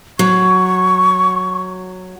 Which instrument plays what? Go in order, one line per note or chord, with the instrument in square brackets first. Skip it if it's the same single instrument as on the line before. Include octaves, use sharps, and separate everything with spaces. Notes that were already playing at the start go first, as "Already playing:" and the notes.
[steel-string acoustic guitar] F#3 [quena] C#6